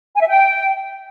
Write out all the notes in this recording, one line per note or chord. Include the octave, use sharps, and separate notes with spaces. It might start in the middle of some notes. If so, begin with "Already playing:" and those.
G#5
E5
G5